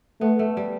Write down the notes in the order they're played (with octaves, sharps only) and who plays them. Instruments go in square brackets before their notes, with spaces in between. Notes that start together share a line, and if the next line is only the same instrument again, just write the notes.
[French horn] A3 [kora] B3
[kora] A3
G3